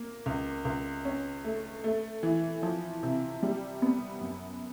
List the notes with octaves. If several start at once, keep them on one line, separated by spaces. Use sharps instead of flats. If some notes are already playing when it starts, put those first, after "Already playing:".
Already playing: A#3
C#2
C#2
C#4
A3
A3
E3
F3
C3
G3
B3
F#2